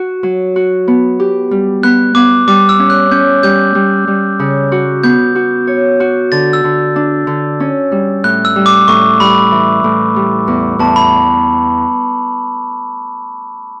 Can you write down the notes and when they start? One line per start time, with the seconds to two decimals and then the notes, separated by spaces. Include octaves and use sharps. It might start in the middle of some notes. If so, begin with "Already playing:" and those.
Already playing: F#4
0.23 F#3
0.56 F#4
0.88 B3
1.20 G4
1.51 G3
1.83 B3 F#6
2.15 B3 D6
2.47 G3 D6
2.69 E6
2.79 C#4
2.90 F#6
3.11 C#4 G6
3.43 G3 G6
3.75 G3
4.07 G3
4.39 C#3
4.72 F#4
5.03 B3 G6
5.35 F#4
5.67 C#5
6.00 F#4
6.32 D3 A6
6.53 E6
6.64 D3
6.96 D4
7.27 D3
7.60 C#4
7.92 G3
8.24 A2 F#6
8.45 E6
8.56 G3
8.66 D6
8.88 A2 C#6
9.20 G3 B5
9.52 E3
9.84 A2
10.16 G3
10.48 E2
10.79 E2 A5
10.96 B5